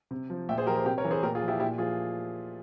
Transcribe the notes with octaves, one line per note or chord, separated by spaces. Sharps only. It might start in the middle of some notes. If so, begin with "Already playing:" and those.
C3
F3
A#2 E5 G5
G#4 C5
F3 G4 A#4
G#4 C5
C3 G4 A#4
A#4 C#5
E3
G#4 C5
A#2 G4 A#4
F4 G#4
F3
E4 G4
A#2 E4 G4
F3 F4 G#4